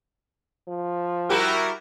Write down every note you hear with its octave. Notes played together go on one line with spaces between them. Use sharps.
F3
G3 E4 F#4 G4 A#4